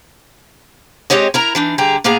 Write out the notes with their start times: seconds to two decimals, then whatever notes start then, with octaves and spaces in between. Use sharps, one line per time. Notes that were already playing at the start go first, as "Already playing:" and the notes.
1.10 G#3 C4 G4 C#5 D#5
1.34 E4 A#4 A#5
1.55 E3 D4 D#4
1.78 D3 G3 G#4 G5 A#5
2.04 A2 A#3 B3 G#4 A#5